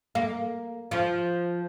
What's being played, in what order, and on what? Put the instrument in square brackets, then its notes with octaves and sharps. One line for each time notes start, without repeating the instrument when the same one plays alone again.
[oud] A#3
F3